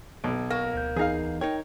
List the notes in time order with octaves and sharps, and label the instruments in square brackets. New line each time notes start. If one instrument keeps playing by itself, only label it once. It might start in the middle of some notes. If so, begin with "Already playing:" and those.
[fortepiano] B1
[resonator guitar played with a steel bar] A#3 [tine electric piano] A#6
[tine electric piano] D2 G6
[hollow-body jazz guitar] E2 D#4 [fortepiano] G#4 F5
[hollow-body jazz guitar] D#4 A#4 C#5 [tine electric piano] G5